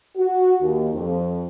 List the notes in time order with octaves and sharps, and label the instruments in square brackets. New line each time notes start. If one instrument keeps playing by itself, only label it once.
[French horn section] F#4
D#2
F2